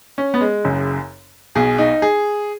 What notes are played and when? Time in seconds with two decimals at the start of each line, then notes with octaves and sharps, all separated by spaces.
0.18 C#4
0.34 B3
0.41 G#3
0.64 F#1 F#2 C#3
1.55 B1 B2 G#4
1.78 D#4
2.02 G#4